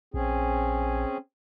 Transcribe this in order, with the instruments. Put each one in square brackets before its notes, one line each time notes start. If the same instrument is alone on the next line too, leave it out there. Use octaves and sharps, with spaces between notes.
[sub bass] A#1 [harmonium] C4 C#4 G#4